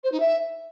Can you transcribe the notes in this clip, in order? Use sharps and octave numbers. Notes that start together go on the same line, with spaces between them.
C5
D#4
E5